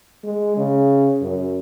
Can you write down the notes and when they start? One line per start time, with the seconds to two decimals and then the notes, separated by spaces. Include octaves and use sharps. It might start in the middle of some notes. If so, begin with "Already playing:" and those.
0.24 G#3
0.57 C#3
1.21 F#2